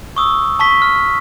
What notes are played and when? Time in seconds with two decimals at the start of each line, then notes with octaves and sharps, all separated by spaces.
0.16 C#6 D#6 E6
0.59 A5 C#6 B6
0.82 F6